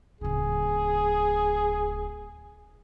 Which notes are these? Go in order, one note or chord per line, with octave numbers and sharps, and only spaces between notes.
D1 C#3 G#4